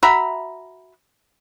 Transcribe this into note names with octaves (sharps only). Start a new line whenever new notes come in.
F#4 E5 A#5 B5